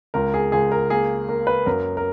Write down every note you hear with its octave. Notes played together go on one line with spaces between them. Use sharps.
C#2 A#4
G#4
C#2 G#4
A#4
A#3 G#4
A#3 A#4
B4
F#2 A#4
A#4